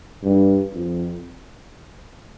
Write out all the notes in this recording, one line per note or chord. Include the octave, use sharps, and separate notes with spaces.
G2
F2